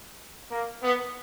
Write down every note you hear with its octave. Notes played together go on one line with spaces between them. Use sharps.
A#3
B3